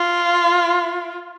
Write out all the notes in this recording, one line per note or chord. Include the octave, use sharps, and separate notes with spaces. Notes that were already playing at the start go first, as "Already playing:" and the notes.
Already playing: F4